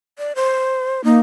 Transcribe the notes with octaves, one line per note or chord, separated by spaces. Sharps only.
D5
C5
A#3 D#4